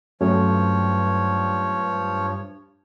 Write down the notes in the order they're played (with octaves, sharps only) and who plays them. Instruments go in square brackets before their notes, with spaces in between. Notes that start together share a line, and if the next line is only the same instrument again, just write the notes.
[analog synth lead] G2 [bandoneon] F3 C#5 [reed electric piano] F#3 A3 C#4